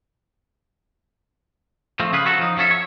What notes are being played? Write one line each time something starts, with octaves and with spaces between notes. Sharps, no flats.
F3 A3 C4
C#3 F4 G#4 B4
F3 F#3 F#4 A4
F3 D#4
F3 F#3 C#4 A4 E5
C#5